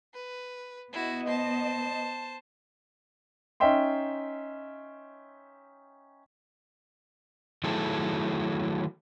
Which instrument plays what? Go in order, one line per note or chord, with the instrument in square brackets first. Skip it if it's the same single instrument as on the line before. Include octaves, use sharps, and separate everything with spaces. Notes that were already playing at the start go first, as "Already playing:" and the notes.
[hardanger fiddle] B4
[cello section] B3 D#5 [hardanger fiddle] E4 F#4
[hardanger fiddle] C5 A5
[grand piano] C#4 D#4 D#5 E5 G5 C6
[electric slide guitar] D#3 F#3 A3 E4 G#4 A4